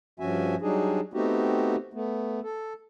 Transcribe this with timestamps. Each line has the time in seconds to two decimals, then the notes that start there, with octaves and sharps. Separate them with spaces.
0.20 G2 F3 C#4 F#4 E5 G#5
0.62 F#3 G3 D4 D#4 G#4
1.14 A3 B3 C4 D#4 F#4 G4
1.94 A3 B3
2.43 A4